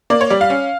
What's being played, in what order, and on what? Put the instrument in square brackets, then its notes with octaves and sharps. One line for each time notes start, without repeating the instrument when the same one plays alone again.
[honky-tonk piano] A#3 D5
C#5
G3 D5
F5
C#4